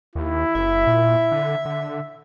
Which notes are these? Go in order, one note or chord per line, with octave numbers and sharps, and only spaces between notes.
D#2 E4
F#1 E5
A#2
D3
D3